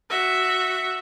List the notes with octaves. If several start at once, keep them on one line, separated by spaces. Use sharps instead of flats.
F#4 E5